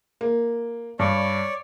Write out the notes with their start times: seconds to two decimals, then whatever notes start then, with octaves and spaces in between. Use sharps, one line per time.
0.21 A#3
0.99 G2 C#5 D5